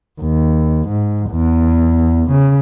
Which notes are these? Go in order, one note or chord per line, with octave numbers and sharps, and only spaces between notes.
D#2
G#2
E2
C#3